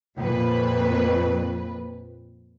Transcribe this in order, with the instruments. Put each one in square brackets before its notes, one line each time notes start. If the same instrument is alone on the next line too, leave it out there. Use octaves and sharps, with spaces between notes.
[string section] F2 A#2 B4